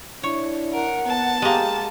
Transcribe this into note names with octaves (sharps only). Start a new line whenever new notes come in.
D4 E4 C#5
A#4 F#5
B3 A5
G#3 A#3 G4